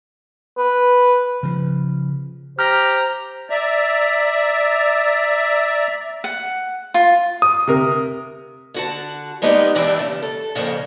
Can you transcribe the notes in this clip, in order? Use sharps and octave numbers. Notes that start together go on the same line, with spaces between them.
B4
C#3 F3
G4 C5 A#5 F6
D5 E5 A#5
F#5
F4
D#6
C3 A#4
D3 F#4 A5
G3 G#3 B3 D#4 G4
E2 G2 E3 D4 G5
C#3
A4
F2 A#2 C#3